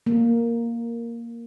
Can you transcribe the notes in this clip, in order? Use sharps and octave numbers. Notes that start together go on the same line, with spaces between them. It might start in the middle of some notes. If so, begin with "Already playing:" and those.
A#3